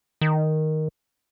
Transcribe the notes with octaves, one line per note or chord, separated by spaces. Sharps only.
D#3